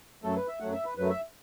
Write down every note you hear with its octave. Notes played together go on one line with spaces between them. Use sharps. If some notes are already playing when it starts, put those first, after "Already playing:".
F#2 F#3 A3 A4
B4
E5
F#2 F#3 A3 F#5
E5
B4
F#2 F#3 A3 B4
E5